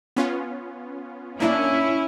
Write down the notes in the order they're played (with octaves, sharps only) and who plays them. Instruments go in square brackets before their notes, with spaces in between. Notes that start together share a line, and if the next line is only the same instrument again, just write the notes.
[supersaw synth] B3 C#4 F4
[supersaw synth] A#3 D4 [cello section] C#4 E4